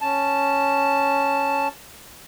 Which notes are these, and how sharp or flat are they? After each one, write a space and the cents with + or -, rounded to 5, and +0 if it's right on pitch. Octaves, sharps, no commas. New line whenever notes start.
C#4 +0 A5 +0